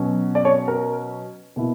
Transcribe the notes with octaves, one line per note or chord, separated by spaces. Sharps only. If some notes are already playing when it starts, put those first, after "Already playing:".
Already playing: B2 F#3 C#4
D5
C#5
A#4
B2 A#3 E4